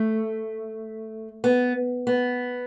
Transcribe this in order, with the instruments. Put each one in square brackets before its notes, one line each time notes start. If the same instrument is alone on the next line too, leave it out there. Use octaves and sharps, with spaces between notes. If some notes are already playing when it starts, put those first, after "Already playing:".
Already playing: [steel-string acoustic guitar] A3
B3
B3